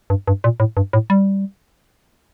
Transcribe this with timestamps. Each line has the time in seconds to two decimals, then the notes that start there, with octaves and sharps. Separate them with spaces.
0.10 G2
0.28 G2
0.44 A#2
0.60 A2
0.77 G2
0.93 A2
1.10 G3